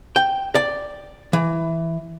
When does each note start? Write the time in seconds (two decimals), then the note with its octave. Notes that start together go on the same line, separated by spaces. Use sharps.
0.16 G5
0.55 D5
1.33 E3